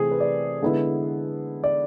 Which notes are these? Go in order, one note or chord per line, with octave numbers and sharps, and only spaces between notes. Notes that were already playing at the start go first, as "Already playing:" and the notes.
Already playing: C3 E3 A3 C4 G#4
B4
D5
D3 G#3 B3 E4
D5